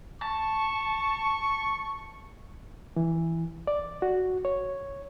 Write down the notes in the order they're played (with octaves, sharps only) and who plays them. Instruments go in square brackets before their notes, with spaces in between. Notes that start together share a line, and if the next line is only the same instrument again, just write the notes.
[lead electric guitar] A5 [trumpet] C#6
[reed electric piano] E3
D5
F#4
C#5